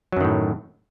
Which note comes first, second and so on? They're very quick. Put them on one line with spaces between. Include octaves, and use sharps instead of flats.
F#3 F#2 D#3 A2